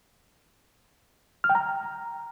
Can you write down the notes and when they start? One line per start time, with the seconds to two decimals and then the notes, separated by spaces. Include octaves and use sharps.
1.44 F6
1.49 G5
1.55 A#5